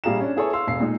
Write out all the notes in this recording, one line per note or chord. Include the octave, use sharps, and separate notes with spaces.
A#1 G3 G#4 F5 A#5 E7
C#4 D4
B3 E4 G#4 A4 C#5
F5 C6 E6
E1 F5 C7
A#2 G#3 D#4